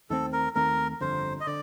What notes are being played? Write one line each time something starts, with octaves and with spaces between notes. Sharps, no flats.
D#2 D#3 A3 C4 A4
A#4
D#2 D#3 A3 C4 A#4
G1 F2 D3 C5
D#5
D3 D5